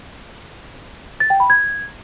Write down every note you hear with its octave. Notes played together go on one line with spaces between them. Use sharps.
A6
G5
B5
G#6